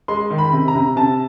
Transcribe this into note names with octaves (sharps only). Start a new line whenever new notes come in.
G#3 C6
D#3
B5
C3
A#5
C3
C3 A5